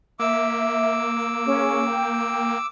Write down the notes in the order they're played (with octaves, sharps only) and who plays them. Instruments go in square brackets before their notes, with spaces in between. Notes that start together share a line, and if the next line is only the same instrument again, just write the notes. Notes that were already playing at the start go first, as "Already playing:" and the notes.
[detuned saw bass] A#3 [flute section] E5 [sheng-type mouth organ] D6 E6
[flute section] C#4 G#4
G5